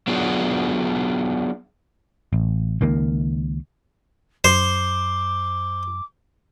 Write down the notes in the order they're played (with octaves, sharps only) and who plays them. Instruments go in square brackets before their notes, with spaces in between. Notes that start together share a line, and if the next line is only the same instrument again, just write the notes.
[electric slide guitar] F#3 B3 D4 F4 G#4
[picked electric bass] A1
C#2 D#3 A#3
[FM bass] F#2 [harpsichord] C5 [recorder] D6